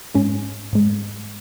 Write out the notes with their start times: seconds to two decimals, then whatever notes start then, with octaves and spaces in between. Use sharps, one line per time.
0.15 G#2 G#3 C#4
0.73 G#2 G#3